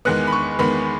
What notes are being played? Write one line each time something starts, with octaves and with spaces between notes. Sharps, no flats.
E2 D#3 G#3 B3 F#6
B5
C#6
E2 D#3 G#3 B3 B5